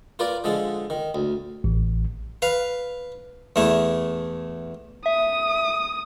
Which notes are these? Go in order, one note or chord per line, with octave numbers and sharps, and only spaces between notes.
F4 A#4 B4 D5
D3 F3 G#3 A4
D#3
D2
A1
B4 F5
E2 A3 E4
E5 D#6